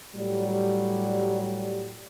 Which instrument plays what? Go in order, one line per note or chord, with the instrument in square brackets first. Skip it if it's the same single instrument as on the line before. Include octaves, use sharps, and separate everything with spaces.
[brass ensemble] A2 F#3 G3